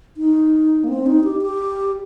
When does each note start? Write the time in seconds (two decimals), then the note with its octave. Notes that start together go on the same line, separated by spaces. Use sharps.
0.17 D#4
0.84 A#3
0.88 C4
1.06 D#4
1.24 G4
1.42 G4